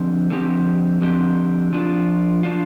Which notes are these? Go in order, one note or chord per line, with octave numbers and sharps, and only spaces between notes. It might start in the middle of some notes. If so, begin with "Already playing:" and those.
Already playing: D3 F3 C4 G4
D3 F3 C4 G4
D3 F3 C4 G4
F3 D4 F4
F3 D4 F4